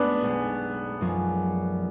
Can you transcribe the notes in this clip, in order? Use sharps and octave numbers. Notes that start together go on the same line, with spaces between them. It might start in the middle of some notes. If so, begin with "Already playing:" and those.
Already playing: G#3 B3 D4
B1 B2 G#3
F#2 F3 G#3 C#4